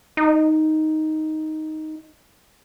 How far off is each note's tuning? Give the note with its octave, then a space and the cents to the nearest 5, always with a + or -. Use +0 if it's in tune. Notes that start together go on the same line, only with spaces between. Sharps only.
D#4 +5